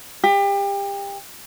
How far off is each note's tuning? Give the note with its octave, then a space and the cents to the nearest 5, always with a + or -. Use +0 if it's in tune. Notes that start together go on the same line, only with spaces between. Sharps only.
G4 +30